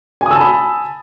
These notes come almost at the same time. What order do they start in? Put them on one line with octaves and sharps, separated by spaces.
G#5 D#6 E6 A5 B5